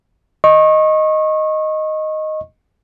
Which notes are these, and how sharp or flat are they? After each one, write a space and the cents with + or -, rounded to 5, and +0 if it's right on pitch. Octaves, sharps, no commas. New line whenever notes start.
D#5 +0 C#6 -30